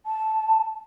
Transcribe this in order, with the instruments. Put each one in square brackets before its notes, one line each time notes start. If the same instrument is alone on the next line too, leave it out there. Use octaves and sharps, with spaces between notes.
[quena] A5